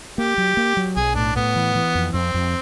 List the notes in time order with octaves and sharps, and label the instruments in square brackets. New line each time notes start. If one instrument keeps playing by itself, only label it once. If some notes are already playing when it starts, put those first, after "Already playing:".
[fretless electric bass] A#3 [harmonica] G4
[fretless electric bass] F#3
A#3
F#3
[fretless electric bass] B1 [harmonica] G#4
[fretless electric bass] A2 [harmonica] D4
[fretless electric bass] A2 [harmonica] B3
[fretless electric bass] E3
E3
F2
[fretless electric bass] F2 [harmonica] C4
[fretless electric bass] F2